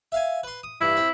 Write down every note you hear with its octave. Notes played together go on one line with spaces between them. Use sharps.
E5 F5 G#5
B4 C6
D#6
G2 E3 E4
C4